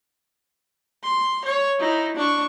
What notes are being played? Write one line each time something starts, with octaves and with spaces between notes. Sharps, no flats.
C6
C#5
D#4 E4
D4 C#6